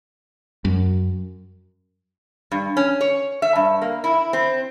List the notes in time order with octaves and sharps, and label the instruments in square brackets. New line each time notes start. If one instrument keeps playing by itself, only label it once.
[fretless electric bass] F#2
[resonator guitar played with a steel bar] G2
C#4
C#5
E5
G2
A#3
E4
C4